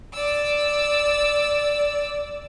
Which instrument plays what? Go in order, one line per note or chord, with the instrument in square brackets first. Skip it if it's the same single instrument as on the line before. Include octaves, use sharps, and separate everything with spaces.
[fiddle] D5 E6